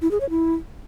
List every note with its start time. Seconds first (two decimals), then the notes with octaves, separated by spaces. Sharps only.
0.02 E4
0.11 G#4
0.21 C#5
0.30 E4